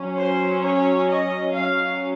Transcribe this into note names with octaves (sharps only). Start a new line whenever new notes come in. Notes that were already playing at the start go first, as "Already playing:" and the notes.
Already playing: F#3 C#4
C5
C#5
D#5
F#3 C#4 F5